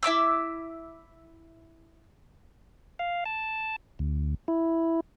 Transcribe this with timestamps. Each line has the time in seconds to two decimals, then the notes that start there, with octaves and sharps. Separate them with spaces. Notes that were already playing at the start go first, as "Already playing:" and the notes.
0.03 E4 E5 D6 E6
2.99 F5
3.25 A5
3.99 D2
4.48 E4